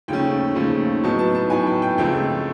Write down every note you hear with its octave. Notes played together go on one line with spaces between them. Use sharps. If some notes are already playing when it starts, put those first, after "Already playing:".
D#2 C#3 F3 A3 C#4 G5
D#2 C#3 F3 A3 C#4
A2 F#3 B3 D#4 A5
A5
A5
A2 F#3 B3 D#4 G#5
G5
G5
C#2 C#3 F3 A3 C4 G5